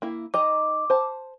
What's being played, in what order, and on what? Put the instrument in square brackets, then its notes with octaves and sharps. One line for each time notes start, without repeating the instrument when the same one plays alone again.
[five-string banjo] A#3 E4
[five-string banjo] D#4 D#5 A#5 [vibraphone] D6
[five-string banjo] C5 A5